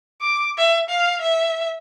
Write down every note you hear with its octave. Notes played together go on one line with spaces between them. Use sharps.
D6
E5
F5
E5